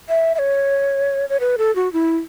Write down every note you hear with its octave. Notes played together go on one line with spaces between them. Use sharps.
E5
E5
C#5
C#5
B4
A4
F#4
E4